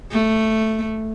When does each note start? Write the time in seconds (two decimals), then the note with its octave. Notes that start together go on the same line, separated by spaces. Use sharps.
0.12 A3